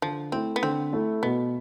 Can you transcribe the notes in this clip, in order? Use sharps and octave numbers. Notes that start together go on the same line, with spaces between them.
D3 F3
A3 C4 E4
B3
D3 C4
A3 E4
B2 B3